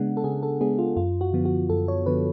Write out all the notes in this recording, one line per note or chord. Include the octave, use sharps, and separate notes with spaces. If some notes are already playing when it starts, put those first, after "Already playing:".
Already playing: C#3 G#3 B3 D4 F#5
A4
C#3 G#4
A4
G#3 B3 D4 G#4
F4
F#2 F4
F#4
D3 F3 B3
F#4
F#2 A4
C#5
D3 F3 B3 B4